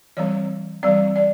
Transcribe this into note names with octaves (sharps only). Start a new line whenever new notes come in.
E3 G3 C4 C#5
E3 G3 C4 D5
D5